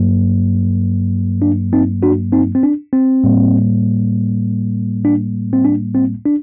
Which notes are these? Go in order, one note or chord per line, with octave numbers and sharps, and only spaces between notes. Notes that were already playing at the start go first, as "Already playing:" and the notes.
Already playing: G2 F#3 A#3
D4
C4 D#4
D4 F#4
C4 D#4
C4
D4
C4
A2 G3 A#3
D4
C4
D4
C4
D4